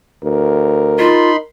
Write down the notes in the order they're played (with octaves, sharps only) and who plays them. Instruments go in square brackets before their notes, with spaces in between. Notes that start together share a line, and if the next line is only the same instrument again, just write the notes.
[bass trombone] D2 [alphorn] A#4
[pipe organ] D#4 B5 C6 [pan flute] F4